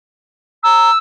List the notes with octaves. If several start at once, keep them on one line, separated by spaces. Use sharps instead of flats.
A#5 E6